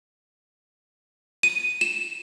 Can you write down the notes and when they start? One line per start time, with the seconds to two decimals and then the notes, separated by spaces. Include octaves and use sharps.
1.43 D#7
1.81 E7